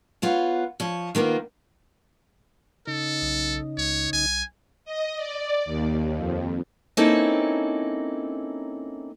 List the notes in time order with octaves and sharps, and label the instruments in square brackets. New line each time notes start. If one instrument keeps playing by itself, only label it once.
[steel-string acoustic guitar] B3 F4 C#5 F#5
F3 C#5
D#3 A#3 B3 F4
[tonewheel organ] C#3 D#4 [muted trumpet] A4
[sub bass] B1
[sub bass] C#2 [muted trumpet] C#5
[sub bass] B1 [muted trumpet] G#5
[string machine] D#5
D5
D#2
F2
[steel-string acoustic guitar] A#3 C4 C#4 D#4 E4 A4